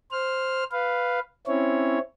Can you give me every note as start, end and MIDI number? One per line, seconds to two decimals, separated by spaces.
0.12 0.64 72
0.12 0.64 89
0.72 1.19 71
0.72 1.19 77
1.47 1.99 60
1.47 1.99 61
1.47 1.99 64
1.47 1.99 73